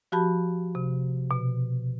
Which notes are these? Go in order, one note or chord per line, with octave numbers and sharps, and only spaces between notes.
F3 F#4 G4 A5 B5
C3
B2